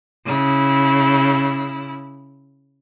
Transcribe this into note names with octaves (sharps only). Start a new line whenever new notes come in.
C#3 E4